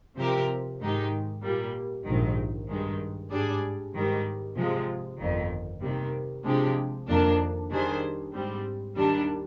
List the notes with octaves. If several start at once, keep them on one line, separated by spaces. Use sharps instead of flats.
C3 F3 C4 G4 A#4
G#2 D#3 G#3 D#4 G4
A#2 G3 A#3
A#1 G#2 D#3
G2 D#3 G#3
G#2 G3 D4 G#4 D5
G#2 D#3 G3
C3 F3 G#3
G1 F2 D#3
C3 D#3 G3 A#3
C3 F3 G#3 D4 G4
F2 D#3 A#3 D4
D#3 G3 D4 G#4 C5
G#2 G3 C4
D#2 D#3 G3 D4